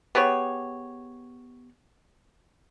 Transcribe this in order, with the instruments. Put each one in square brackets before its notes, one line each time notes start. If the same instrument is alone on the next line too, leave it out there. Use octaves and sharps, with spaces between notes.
[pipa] B3 G4 G#4 C#5